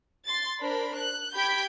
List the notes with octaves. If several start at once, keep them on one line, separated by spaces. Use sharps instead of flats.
C6 A6
D4 A#4 C5 B5
F#6
G4 B5 G6 G#6 B6 D7